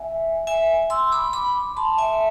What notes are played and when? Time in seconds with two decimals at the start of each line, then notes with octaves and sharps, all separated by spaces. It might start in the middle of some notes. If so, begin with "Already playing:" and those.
Already playing: E5 G#5
0.47 E5 G#5
0.90 C6 E6
1.12 B5 D6
1.33 B5 D6
1.77 A5 C6
1.98 E5 G#5